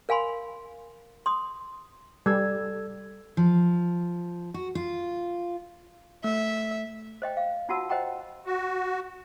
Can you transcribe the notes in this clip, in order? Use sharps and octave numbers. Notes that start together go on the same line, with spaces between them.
A#4 F5 G#5 B5 C6
C6 D#6
G3 A4 E6 G#6
F3
F#4
F4
A3 E5
C5 D#5 G5
F5
D#4 F4 F#4 F#5 A5 E6
C5 D#5 F#5 G5 A#5
F#4